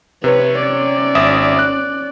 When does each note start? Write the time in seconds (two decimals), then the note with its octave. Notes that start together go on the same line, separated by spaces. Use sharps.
0.24 C3 B4 C#5
0.59 C#4 D5
1.15 G#1 E5 D#6
1.59 F#6